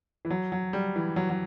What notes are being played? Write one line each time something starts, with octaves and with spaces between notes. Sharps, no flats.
E3
F#3
F#3
G3
E3
F#3
F#3